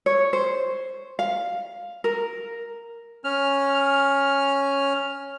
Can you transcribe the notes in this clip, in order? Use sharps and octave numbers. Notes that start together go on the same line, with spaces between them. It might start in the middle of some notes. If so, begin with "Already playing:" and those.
C#5
C5
F5
A#4
C#4 F6